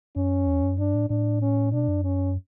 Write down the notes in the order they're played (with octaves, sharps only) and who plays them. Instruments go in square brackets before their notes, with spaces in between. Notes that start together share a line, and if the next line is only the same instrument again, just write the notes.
[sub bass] F#2 [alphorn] C#4
[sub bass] E2
F#2
[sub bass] G2 [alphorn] D4
[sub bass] A2
[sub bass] A2 [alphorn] D4
[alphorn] C#4
[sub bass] B2 [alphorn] D4
[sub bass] F#2
[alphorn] C#4